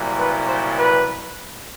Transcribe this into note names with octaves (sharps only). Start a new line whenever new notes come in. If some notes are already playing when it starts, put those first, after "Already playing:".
Already playing: C2 A#2 F#3
B4
C5
B4